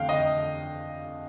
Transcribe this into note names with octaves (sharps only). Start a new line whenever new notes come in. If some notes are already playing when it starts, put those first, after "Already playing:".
Already playing: F2 D3 A3 D4 F5 G5
D#5